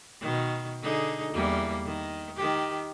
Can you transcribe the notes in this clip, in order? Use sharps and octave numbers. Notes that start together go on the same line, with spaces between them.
B2 D#3
D3 D#4 G#4
E2 G3 A#3
D#3
D#3 G4